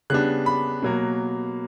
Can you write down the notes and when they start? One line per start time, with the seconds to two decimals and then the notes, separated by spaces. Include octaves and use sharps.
0.10 C#3 G3 B3 D4 F#6
0.46 B5
0.82 B2 F#3 A#3